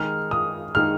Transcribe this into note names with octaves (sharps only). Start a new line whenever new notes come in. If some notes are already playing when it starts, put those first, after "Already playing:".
Already playing: D#3 G#3 D#4 G#4 F6
D#6
D#3 G#3 D#4 G#4 F6